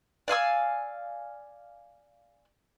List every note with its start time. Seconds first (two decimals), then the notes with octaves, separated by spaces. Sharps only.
0.28 D5 F5 G#5 E6